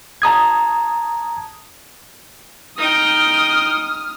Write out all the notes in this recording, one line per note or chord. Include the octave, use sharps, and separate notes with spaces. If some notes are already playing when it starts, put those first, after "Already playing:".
A5 A#5 D#6 G#6
D#4 G5 D#6 F6